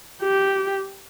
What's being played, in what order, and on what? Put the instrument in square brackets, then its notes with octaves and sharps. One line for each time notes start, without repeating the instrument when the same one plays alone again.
[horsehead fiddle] G4